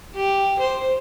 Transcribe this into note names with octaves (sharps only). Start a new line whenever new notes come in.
G4
C5